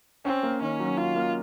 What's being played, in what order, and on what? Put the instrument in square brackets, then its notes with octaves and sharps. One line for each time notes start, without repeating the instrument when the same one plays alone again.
[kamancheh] C4 [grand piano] C#4
[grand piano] A#3
[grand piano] D#3 [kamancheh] C#4
[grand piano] F#3
[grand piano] C#4 [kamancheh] F4
[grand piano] A#3